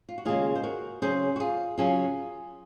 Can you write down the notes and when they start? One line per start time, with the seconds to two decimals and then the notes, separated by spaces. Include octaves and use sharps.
0.09 F4
0.18 F#4
0.25 D#2 C#3 G#3 F4 G#4
0.55 C5
0.63 F#4 A#4
1.02 C#3 F#3 C#4 G#4 C5
1.36 F#4
1.40 F4 G#4
1.78 C#3 F#3 C#4 F4 G#4